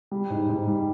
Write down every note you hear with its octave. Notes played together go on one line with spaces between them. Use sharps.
G3
G#2
G#2
G3